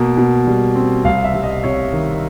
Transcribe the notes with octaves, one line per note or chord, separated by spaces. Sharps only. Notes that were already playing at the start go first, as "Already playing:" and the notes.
Already playing: B2 A#3
B2
G3
C4
C2 F5
E5
G3
D#5
C3 C#5
D#3